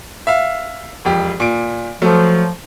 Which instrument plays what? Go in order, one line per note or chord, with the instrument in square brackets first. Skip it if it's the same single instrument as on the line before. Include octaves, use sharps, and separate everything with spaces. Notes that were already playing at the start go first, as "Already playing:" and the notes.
[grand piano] E5 F5
E1 F2 G4
A#2 D7
[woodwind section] F3 [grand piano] F#3 A3